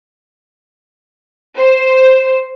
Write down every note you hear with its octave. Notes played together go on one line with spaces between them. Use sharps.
C5